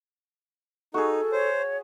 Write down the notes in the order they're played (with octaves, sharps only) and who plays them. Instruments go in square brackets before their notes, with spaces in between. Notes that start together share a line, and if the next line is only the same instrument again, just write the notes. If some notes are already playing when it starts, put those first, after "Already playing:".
[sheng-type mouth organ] D#4 [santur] F#4 G#4 [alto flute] A4
[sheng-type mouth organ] C5 [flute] C#5